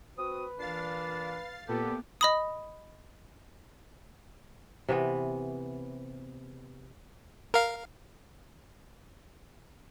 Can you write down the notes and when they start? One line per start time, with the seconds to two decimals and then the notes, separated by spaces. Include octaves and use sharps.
0.18 C4 F#4 B4 D#6
0.59 A#2 E3 D4 F5 A6 C7
1.68 A#2 B3 G4 A4
2.21 D#5 B5 D#6
4.88 C3 E3 B3
7.54 A#4 F5